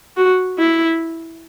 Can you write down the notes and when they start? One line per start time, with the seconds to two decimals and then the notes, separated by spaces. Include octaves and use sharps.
0.17 F#4
0.58 E4